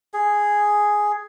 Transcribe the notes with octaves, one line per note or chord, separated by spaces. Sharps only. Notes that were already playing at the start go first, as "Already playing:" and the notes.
G#4